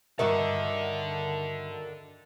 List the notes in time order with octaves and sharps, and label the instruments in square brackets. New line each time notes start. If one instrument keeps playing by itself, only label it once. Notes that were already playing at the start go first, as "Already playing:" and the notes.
[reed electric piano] G2 E5 [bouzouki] D#3 F#4 A5 [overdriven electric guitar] A4 D5 [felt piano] A#4